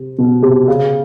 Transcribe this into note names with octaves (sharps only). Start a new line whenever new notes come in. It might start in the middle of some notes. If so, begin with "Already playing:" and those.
Already playing: C3
B2
C3
C#3